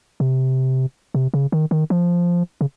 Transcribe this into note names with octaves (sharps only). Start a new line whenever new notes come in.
C3
C3
C#3
D#3
D#3
F3
C#3